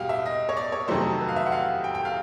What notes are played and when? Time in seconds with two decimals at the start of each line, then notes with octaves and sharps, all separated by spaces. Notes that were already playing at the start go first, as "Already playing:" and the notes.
Already playing: E2 B2 G3 F5 G5
0.09 E5
0.26 D#5
0.49 C#5
0.57 D5
0.72 C#5
0.88 F2 C3 D#3 F#3 A3 C5
1.21 B4
1.29 F5
1.36 E5
1.46 F#5
1.52 F5
1.84 G5
1.95 G5
2.05 F5